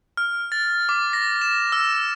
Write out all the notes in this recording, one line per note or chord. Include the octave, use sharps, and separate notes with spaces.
F6
A6
D6
A#6
E7
E6